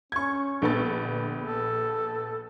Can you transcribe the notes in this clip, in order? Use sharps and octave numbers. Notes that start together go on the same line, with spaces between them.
C#4 C#6 G#6
A#1 B3 A4 A6
D3
A4